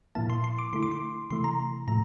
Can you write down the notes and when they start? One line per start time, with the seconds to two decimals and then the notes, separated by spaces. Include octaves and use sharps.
0.15 A#2 F3 A#3 E4 A5
0.30 C6
0.44 C6
0.59 D6
0.73 D3 A3 E4 C6
0.83 D6
0.91 C6
1.30 C3 E3 A3 E4 C6
1.44 A#5
1.87 A2 F3 A3 A#5